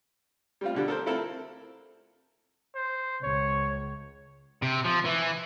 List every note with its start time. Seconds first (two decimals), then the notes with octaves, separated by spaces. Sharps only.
0.61 G3 C4 F4
0.75 B2 D3 G3
0.88 A4 A#4 C5
1.06 C4 E4 F4 A4 A#4 A5
2.75 C5
3.23 C#2 C#5
4.62 C3
4.85 F3
5.05 E3